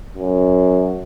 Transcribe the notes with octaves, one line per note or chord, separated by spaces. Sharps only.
F#2